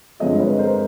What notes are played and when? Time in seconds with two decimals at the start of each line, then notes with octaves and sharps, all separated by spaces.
0.20 G2 D3 F3 G#3 C4 C#5 D#5
0.40 B4 C#5
0.59 A#4 C5